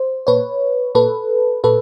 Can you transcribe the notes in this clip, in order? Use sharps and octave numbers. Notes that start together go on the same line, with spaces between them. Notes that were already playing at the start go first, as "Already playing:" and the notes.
Already playing: C5
A#2 B4 C#5
A#2 A4 B4
A#2 A4 B4